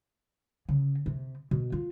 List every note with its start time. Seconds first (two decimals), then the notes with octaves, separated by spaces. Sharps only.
0.69 C#3
1.06 C3
1.51 B2
1.72 F4